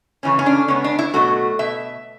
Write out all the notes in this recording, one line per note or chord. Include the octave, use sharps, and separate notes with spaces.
F#2 C#3 E3 A3 C#4
C#4
D4
C#3 G#3 B3 C#4
D4
E4
B2 F#3 A3 F#4
B2 E5